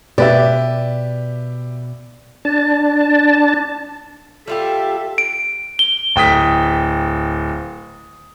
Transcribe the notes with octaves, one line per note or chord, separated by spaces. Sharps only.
B2 G4 B4 D5 E5
D4 A5
G3 F4 G4 A4 E5
D7
G7
D1 G5 D#6 B6